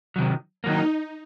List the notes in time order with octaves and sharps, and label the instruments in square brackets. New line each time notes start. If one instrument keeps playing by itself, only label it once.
[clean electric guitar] C3 D#3 F#3
[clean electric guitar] D#3 F#3 A#3 [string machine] D#4